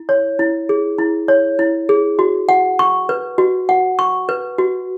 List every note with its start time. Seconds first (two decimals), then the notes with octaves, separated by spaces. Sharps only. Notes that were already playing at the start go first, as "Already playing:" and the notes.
Already playing: E4
0.09 C#5
0.39 E4
0.69 G#4
0.98 E4
1.28 C#5
1.59 E4
1.89 G#4
2.19 F#4
2.49 F#5
2.79 C#6
3.09 B4
3.38 F#4
3.69 F#5
3.99 C#6
4.29 B4
4.58 F#4